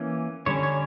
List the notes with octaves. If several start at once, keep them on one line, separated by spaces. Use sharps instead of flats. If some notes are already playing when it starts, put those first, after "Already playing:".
Already playing: E3 A#3 C#4
D3 G3 C#4 C#5
C#5